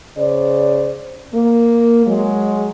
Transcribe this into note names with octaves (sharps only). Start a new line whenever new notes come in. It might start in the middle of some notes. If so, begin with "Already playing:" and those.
C#3 C5 D5
A#3
F#3 G#3